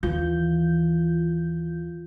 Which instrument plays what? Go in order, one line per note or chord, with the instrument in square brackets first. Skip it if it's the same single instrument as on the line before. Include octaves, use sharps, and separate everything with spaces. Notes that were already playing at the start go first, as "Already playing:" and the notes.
[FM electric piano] D#2 F4 G6 [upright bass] E3